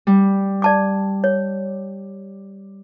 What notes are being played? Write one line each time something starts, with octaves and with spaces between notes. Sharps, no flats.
G3
D5 A5 D6
C#5